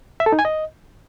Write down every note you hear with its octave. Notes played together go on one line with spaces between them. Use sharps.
E5
A4
D#4
G#5
D#5